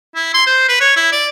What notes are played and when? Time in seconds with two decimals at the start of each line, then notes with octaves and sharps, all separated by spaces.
0.15 E4
0.34 C6
0.47 C5
0.69 B4
0.81 C#5
0.97 E4
1.12 D5